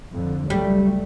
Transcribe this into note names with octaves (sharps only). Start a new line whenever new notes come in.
F2 D3
C#2 F#3 G3 A3